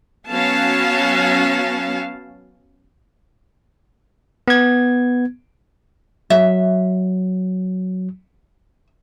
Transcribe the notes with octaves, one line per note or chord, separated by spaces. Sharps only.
F#3 B3 C#4 F5 A5
B3 G#6
F#3 E5